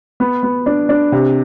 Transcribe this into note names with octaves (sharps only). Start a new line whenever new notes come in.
B3
B3
D4
D4
C3